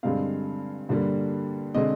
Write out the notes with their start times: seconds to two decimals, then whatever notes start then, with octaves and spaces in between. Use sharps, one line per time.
0.03 G2 D3 G#3 C4 F5
0.89 G2 D3 G3 A#3
1.74 D3 G#3 C4 D#5